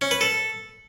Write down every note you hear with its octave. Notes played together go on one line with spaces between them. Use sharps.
C#4
B4
A4